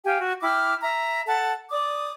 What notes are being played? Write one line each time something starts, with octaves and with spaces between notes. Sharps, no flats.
G4 F5 G5 G#5
F#4
E4 G5 D6 F6
E5 A#5
A4 F#5 A5
D5 D6 D#6